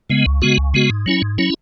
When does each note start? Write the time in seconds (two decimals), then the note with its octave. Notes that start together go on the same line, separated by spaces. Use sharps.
0.10 C#3 G#3 B3
0.26 C#2
0.42 C#3 G#3 B3 F#4
0.58 C#2
0.74 C#3 G#3 B3 F#4
0.90 G#2
1.06 F#3 C#4 E4
1.22 G#2
1.38 F#3 C#4 E4